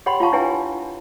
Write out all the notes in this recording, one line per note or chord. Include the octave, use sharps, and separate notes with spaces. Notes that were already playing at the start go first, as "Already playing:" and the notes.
G4 C#5 F#5 G5 B5 C6
F4 F5 A5 C#6
D4 E4 B4 C#5 G5 G#5